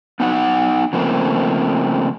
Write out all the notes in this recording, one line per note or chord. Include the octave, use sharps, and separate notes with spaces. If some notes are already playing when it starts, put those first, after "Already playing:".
B3 D#4 F#4 F#5
C#3 F3 A3 A#3 C4